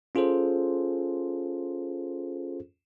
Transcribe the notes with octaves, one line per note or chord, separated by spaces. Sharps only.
C#4 F4 G#4 A4 C5